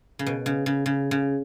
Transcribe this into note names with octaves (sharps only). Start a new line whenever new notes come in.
C#3
B2
C#3
C#3
C#3
C#3